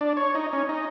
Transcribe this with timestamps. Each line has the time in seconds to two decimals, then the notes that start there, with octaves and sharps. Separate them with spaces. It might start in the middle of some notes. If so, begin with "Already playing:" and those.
0.01 D4
0.17 C#5
0.35 D#4
0.53 C#4
0.69 D#4